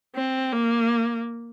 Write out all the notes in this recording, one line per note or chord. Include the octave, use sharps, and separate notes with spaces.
C4
A#3